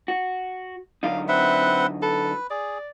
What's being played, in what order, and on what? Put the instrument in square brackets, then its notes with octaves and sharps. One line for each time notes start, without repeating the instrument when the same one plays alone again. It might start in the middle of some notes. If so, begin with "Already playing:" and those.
[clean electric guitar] F#4
[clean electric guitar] D3 F#3 D#4 [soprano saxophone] F5
[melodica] C4 B4 F#5 [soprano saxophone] E5
[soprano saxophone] A4 [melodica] B4
[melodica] G#4 [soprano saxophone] D5